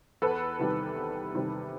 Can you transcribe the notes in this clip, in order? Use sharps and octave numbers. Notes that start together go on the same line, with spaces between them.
E2 A4 B4
C3 D#3 G3
E2
C3 D#3 G3